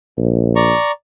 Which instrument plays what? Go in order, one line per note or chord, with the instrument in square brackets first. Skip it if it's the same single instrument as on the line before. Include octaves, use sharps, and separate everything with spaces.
[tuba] A#1
[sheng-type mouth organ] D5 A#5 C#6